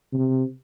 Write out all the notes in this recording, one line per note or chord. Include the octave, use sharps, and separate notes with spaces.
C3